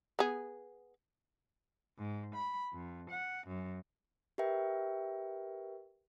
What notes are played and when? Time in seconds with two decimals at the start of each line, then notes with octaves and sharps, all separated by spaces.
0.19 B3 G#4
1.97 G#2
2.34 B5
2.73 F2
3.10 F#5
3.47 F#2
4.38 G4 A#4 B4 E5 G5